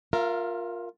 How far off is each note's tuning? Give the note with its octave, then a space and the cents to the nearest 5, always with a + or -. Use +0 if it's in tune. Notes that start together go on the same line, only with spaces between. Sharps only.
F4 +15 A#4 +0 E5 +45